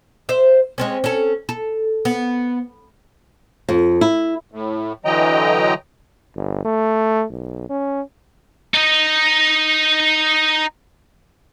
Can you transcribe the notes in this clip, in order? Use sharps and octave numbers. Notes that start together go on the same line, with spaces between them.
C5 E5
G#3 C4 C#4
C#4 A4
A4
B3
F2
E4
A2
D3 E3 F#3 D#5 G5 A#5
G1
A3
B1
C#4
D#4 D#5